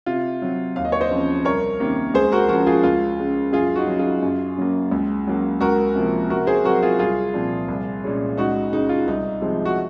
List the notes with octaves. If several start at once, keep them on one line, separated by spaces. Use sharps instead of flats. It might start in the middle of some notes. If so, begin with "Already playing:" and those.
C3 F4
F#3 C4
D#2 F5
D#5
C#5
C5 D#5
C#3 F3 C4
C2 A#4 C#5
C3 D#3 A#3 C#4
C#2 G#4 C5
F#4 A#4
C#3 F3 F#4 A#4
F4 G#4
C#2 F4
C#3 G#3
F#2 F4 G#4
D#4 F#4
C#3 F#3
F4 G#4
F#2
C#3 F#3 A#3
C#2
C#3 F#3 A#3
C#2 F#4 A#4
C3 F3 A#3
C3 F#4 A#4
G#4 C5
F#3 C4 F#4 A#4
F4 G#4
C2 F4 G#4
A#2 F3 C4
C2
A#2 G#3 C#4
C#2 D#4 F#4
C#3 G#3 D#4
F4
C2 D#4
C3 F3 G#3 C4
F#4